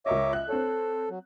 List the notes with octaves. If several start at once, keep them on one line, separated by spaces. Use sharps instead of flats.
C#2 A#4 C#5 D#5 E5 D6
E5 F#6
C4 A4 C#5
F#3